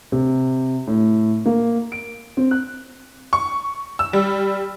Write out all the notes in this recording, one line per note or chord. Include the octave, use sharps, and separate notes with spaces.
C3
A2
A#3
D7
C4
F#6
C#6
E6
G3